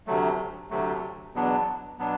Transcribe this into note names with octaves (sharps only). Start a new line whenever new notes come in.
D2 C3 F#3 A3
D2 C3 F#3 A3
E2 B2 F#3 B3 D4
B2 F#3 B3 D4